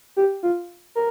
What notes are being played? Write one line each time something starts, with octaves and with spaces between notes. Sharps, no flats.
G4
F4
A#4